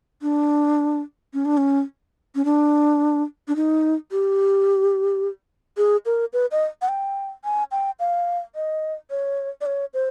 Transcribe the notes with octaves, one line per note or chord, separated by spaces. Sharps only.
D4
C#4
D4
C#4
C#4
D4
D4
D#4
G4
G#4
A#4
B4
D#5
F#5
G5
G#5
G5
F5
D#5
C#5
D5
C#5
C5